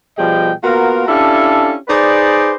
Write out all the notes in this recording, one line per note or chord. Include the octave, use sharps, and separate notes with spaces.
B2 F3 G3 G#4 D#5 G5
A#3 B3 F4 F#4 A#4
C#4 D4 E4 G4 A4 F5
D#4 G#4 B4 C5 D5